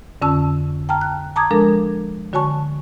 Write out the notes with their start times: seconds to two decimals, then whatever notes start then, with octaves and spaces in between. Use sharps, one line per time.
0.22 F2 D3 C#4 A5 E6
0.89 G5 A5 A#5 F6
1.01 F#6
1.36 A5 A#5 D6 D#6 G#6
1.51 F3 G#3 D4 A4 A#4
2.33 D3 F#4 C#5 G#5 A5 C#6